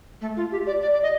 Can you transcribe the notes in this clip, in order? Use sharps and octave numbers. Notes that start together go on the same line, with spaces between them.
A3
F4
G4
D5
D5
D5
D#5